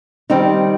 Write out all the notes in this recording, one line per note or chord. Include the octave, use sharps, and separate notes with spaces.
D#3 G3 C4 D#4